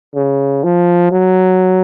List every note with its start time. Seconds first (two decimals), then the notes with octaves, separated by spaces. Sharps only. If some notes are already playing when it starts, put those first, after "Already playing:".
0.15 C#3
0.64 F3
1.12 F#3